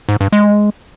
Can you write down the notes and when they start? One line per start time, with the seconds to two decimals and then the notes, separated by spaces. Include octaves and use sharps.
0.09 G#2
0.21 G2
0.32 G#3